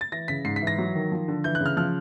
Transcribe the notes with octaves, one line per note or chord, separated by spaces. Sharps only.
A6
E3 A#6
C#3 B6
G#2 C7
B6
E3
A#6
F#3
D#3
F3
D3
E3 G6
F#6
C#3
F6
F3 F6